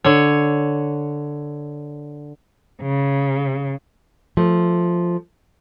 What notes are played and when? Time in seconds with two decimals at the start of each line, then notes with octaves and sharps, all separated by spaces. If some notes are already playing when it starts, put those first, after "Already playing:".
0.04 D3 C#5
2.82 C#3
4.37 F3 A3